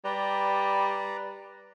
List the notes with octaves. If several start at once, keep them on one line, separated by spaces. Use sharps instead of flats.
G3 B4 D5 A#5